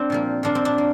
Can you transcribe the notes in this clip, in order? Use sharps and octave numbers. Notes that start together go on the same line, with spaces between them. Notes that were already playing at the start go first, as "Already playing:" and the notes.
Already playing: C4 D4
A#2 F3 A#3
A#2 F3 A#3 D4
C4
D4
A#3